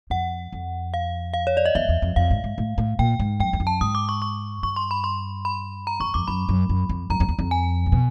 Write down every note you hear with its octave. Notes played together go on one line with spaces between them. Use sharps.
F2 F#5
F2
F5
F5
C#5
D5
D#5
E2 E5
E2
F2
F2 F5
G#2
G#2
A2
A2
A#2 G5
G#2
F#2 G5
F2
F#2
A5
G#2 D#6
D6
C#6
C#6
G2 C#6
C6
B5
C6
B5
A#5
E2 C#6
F2 D6
F#2 B5
F#2
F#2
F2
F#2 A#5
F2
E2
F2
G#5
A#2
B2